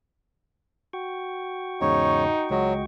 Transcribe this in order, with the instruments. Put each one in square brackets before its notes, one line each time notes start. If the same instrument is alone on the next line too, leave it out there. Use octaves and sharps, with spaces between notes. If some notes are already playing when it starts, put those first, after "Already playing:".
[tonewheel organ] F#4 G5 C#6
[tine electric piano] E2 G#2 C#3 [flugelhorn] D#4 [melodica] C#5
[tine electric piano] C#2 G#3 D#5 [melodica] F#3